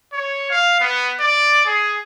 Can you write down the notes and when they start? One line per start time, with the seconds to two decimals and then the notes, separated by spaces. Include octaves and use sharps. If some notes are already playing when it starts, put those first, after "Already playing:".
0.13 C#5
0.50 F5
0.81 B3
1.20 D5
1.66 G#4